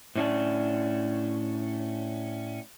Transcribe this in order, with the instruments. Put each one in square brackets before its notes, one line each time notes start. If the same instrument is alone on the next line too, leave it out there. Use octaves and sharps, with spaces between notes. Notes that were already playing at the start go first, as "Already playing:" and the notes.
[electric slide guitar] A2 C#4 D4